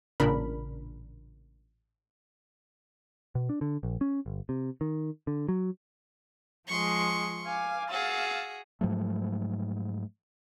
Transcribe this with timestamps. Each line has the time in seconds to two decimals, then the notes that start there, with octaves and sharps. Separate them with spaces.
0.20 A1 A#2 C#3 D4 A#4 B5
3.35 B2
3.49 D4
3.61 D3
3.83 A#1
4.01 C#4
4.26 G1
4.49 C3
4.81 D#3
5.27 D3
5.49 F#3
6.68 F3 G#3 C6 C#6
7.44 F5 G#5 D6
7.89 F#4 G#4 F5 E6 A6
8.81 G#2 F3 F#3 A3